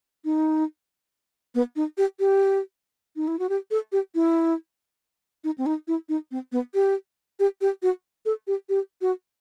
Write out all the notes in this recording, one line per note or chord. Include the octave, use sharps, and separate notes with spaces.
D#4
B3
D#4
G4
G4
D#4
E4
F#4
G4
A4
G4
E4
D#4
C4
D#4
E4
D#4
C4
B3
G4
G4
G4
F#4
A4
G4
G4
F#4